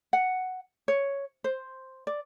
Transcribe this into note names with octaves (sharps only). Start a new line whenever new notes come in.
F#5
C#5
C5
D5